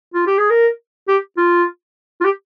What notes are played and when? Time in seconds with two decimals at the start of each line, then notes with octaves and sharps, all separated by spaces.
0.14 F4
0.27 G4
0.39 G#4
0.50 A#4
1.08 G4
1.37 F4
2.21 F4
2.25 G4